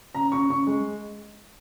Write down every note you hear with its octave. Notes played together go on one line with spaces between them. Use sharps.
C#3 A#5
C#3 C#6
C#3 C#6
G#3